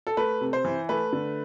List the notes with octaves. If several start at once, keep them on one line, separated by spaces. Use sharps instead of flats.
A4
A3 B4
C3
C5
E3
A3 B4
D3